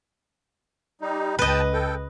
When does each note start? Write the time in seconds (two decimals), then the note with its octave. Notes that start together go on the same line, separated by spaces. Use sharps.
1.01 G3 D#4
1.39 C#2 B4 D#5 G5 A5
1.73 A4 G5